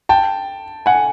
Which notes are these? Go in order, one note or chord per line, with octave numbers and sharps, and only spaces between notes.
G5 A5
F#5 G#5